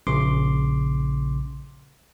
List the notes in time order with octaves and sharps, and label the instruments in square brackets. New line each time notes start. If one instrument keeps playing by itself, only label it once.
[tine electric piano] A#1 C#3 C6 D6